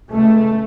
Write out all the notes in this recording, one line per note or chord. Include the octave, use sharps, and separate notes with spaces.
C#2 C#3 A3